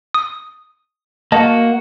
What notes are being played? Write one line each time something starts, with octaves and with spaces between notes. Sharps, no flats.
D#6
A#3 F#4 D#5 A5